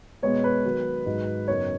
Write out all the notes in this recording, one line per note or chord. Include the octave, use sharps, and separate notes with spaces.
B2 G#3 B3 C#5
B4
D#3 F#3 B3
G#2 F#3 D#4
F#2 C#3 B3 D#4 C#5